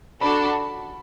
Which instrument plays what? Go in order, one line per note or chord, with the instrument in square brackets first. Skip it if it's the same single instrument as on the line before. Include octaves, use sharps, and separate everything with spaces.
[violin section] D4 F#4 A4 [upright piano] B5
[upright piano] B5